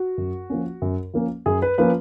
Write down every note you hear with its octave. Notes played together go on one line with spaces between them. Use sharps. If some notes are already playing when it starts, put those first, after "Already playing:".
Already playing: F#4
F#2
F3 A#3 C#4
F#2
F3 A#3 C#4
F#2 G#4
B4
F3 A#3 C#4 B4